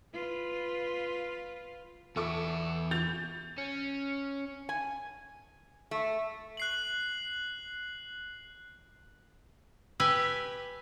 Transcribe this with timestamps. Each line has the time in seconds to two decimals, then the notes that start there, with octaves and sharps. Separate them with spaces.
0.13 F4 B4
2.16 E2 E4 A4 C#6 D6
2.91 G6 A6 F7
3.58 C#4
4.69 G#5
5.91 A3
6.57 F#6 C7 F#7
10.00 G4 B4 G#5 E6